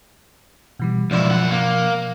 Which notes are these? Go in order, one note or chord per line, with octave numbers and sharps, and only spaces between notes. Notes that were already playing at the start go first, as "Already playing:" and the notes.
B2 E3 G3
C#2 B2 F3 E4 D5
F#2 F#5
A#3